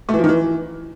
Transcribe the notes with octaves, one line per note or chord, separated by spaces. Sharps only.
A3
E3
F3
D#3
E3